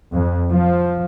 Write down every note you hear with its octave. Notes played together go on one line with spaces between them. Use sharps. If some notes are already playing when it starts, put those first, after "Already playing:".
F2
F3